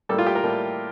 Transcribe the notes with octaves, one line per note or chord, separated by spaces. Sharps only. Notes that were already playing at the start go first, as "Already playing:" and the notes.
A2 G3 A#3 A4
F4
G4
A#4
A2 G3 A#3